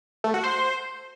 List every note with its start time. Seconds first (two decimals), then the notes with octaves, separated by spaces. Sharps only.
0.24 A3
0.34 F#4
0.44 C5